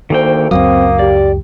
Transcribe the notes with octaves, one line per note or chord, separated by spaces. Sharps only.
D2 D#3 A#3 C5 G5
C#2 F#2 F#3 A#3 C4 D#6
G4 D5